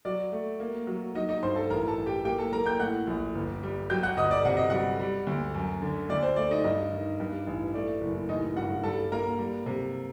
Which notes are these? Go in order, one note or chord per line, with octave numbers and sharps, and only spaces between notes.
F#3 D5
A3
A#3
F#3
F#3 D#4 D#5
D#4 D#5
G2 C5 C6
A4 A5
A1 A#4 A#5
A4 A5
A1
G4 G5
A#3 G4 G5
A4 A5
A#3 A#4 A#5
G5 G6
A2 F#5 F#6
A#1
G1
G3
F#3 G5 G6
F#5 F#6
G1 D#5 D#6
D5 D6
C3 F#5
D#5
G3 F#4 F#5
G3
D2
F#2
D3
D2 D5
C5
A3 D5
D#4 D#5
G2 D#4 D#5
D#3
G2
A1
A3 D5
F#1
A1 D#4 D#5
G2 F#4 F#5
G3 A4 A5
A#3 A#4 A#5
G3
C3